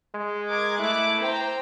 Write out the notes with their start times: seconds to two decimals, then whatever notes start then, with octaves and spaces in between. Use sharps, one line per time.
0.15 G#3
0.48 A#4 D6 G#6
0.79 A3 E4 D6 F#6
1.20 C5 G5 A#5